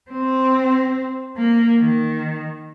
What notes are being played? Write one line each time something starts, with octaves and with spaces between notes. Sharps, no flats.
C4
A#3
D#3